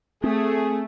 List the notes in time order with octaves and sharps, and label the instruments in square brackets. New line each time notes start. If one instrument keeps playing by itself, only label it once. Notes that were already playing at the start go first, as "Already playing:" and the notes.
[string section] A3 [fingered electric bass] C4 [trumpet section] G#4